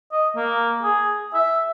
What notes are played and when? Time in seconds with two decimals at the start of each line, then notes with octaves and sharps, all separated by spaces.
0.12 D#5
0.36 A#3
0.83 G#4
1.34 E5